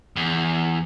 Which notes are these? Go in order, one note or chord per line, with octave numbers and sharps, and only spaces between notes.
E2